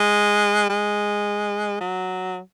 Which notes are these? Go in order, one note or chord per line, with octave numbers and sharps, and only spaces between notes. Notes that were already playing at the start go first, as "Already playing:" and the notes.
Already playing: G#3
G#3
F#3